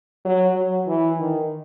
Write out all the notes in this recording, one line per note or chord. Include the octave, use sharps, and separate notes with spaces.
F#3
F#3
E3
D#3